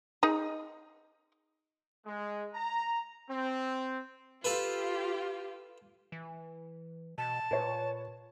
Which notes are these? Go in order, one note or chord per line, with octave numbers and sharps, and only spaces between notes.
D#4 G#4
G#3
A#5
C4
F4 G4 A4 B4
E3
B2 A5
A#2 B4 C#5